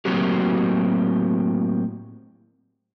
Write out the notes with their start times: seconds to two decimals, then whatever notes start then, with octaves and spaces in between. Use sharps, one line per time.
0.05 A2 F#3 A#3 C4 F#4 G4